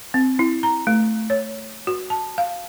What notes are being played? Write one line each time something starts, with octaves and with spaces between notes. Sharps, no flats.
C4
E4
A#5
A3
C#5
F#4
A5
F5